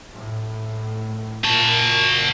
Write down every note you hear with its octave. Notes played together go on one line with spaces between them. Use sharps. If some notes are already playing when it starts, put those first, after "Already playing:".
A2
A#2 F#4 A5